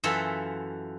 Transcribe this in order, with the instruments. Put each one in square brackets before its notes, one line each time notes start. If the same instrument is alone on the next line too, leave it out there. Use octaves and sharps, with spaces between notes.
[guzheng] F#2 E3 F4 F#4 A4 E5